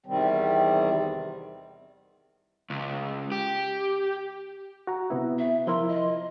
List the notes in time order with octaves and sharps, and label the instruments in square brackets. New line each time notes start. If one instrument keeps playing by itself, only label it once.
[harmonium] E2 C3 D#3 G3 C4
[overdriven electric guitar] C#2
G4
[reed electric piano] F#4 A#5
C3 B3 E4
[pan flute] E5
[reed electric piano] F3 E4 A#4 [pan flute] C6
[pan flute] D#5